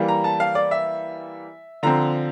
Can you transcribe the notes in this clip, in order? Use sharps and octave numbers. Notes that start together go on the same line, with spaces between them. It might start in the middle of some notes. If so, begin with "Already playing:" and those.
Already playing: E3 G3 A#3
A#5
A5
F5
D5
E5
D3 F3 C4 A#5